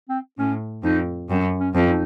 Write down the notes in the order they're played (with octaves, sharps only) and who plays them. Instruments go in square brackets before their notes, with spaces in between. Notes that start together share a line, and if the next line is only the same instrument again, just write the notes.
[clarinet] C4
[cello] A2 [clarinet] C#4
[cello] F2 [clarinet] D#4
[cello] F#2 [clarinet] C4
[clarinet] C#4
[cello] F2
[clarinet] D#4